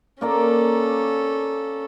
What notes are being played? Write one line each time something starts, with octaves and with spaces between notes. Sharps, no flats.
A#3 C#4 A4 D5 A#5